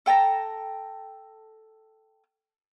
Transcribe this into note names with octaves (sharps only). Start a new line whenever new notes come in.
A4 G5 A5 A#5